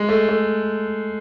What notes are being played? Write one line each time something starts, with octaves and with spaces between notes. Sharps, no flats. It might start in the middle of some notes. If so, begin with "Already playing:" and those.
Already playing: G#3
A3
A3